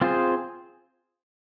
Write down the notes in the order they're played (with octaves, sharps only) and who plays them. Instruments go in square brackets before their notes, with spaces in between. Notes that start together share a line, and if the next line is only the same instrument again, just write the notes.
[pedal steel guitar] C4 F4 G#4 C5